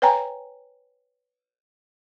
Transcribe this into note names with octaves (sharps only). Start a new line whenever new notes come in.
B4 C#5 G5 G#5 A#5